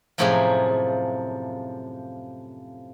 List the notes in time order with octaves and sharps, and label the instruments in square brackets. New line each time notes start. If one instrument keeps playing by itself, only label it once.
[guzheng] F#2 A2 C3 F3 A#3 G#4